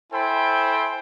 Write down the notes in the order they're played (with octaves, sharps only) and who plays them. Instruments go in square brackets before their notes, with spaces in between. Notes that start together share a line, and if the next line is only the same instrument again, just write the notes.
[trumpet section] E4 A4 C5 G5 G#5 B5